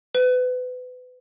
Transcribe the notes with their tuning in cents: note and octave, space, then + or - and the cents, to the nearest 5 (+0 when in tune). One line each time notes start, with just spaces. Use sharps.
B4 +30